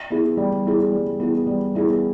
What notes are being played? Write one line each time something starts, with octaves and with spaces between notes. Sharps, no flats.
B3 E4 G#4
G3
B3 E4 G#4
G3
B3 E4 G#4
G3
B3 E4 G#4